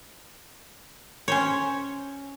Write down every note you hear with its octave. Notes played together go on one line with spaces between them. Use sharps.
C#4 C5 C#5